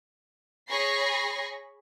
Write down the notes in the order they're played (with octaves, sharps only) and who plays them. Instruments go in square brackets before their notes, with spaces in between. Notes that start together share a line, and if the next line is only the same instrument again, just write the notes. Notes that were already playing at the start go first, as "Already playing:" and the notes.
[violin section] G#4 C#5 B5 C#6 A#6 C7